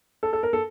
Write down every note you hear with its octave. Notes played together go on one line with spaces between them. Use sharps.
A4
A4
A#4
A4